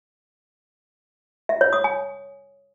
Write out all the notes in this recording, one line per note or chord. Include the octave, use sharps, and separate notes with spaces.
E5
C#5
D#6
G#5